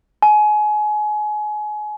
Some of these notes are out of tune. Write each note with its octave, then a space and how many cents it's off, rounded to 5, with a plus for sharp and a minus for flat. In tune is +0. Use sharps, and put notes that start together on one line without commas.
G#5 +30